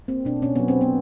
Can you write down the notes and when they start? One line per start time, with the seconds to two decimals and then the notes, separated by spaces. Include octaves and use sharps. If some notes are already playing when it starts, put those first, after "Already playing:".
0.08 A#3 C4
0.25 B2 D4
0.42 B2 C#4
0.56 F#3 B3
0.68 C4
0.76 B2 B3